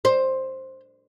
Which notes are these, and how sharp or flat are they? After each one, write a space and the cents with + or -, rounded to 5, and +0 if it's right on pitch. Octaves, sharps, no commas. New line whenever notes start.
C5 +10